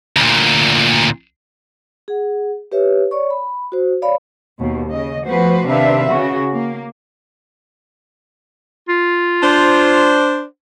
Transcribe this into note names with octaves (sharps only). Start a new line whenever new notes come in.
D2 A#2
G#4 F#5
G4 B4 C#5 E5
C#5 D5 C#6
B5
F#4 C5
C#5 D5 F5 B5
D#2 B2
C#3 D#5
F3 A3 B3 F#4 B4 C5
C3 D#3 D4 B4 E5 F5
C#3 F#4
A#3
F4
D4 C5